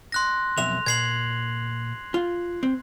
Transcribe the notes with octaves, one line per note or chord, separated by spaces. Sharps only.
C6 F#6 A#6
B1 F2 E5 F7
A#2 G#6 C7 F#7
F4
C4